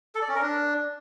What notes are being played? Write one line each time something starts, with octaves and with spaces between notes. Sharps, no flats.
A4
D5
C#4
A#4
D4